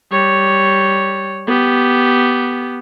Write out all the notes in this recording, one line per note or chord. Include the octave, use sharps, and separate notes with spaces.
G3 C#5
B3 G4